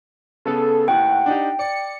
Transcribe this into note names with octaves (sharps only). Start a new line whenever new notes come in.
C#3 B3 A4
A1 D#2 F#5 G5
D4 D#4 G4
D5 C#7